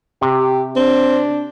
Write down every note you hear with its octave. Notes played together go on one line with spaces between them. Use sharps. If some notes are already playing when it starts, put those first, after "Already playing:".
C3 G4
C4 D4